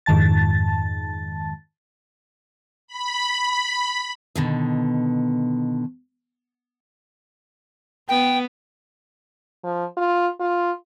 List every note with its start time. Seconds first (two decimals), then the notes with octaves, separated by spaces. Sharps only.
0.06 F2 G#2 D#3 A5 A6
2.87 B5
4.35 B2 D3 D#3
8.09 B3 G5
9.64 F3
9.97 F4
10.40 F4